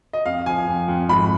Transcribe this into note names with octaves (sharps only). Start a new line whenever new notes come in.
D#5
F2 F5
F3 G#5
F2
F2
G#1 B5